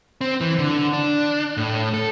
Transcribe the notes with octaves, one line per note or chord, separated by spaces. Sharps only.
C4
E3
D3
D4
A2
A4